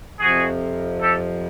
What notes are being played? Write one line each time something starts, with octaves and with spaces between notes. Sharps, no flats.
F2 C3 F3 F#4 G#4
G4 A4